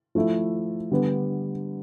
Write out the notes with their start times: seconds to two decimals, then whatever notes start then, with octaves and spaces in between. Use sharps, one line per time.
0.15 F3 A3 E4
0.91 D3 G3 B3